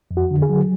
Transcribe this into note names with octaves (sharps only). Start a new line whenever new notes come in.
F2
F#4
D3
G#4
F#3